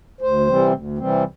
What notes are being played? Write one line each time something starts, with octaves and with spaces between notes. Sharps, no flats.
D2 C5
C3 E3 G3 C4
D2
C3 E3 G3 C4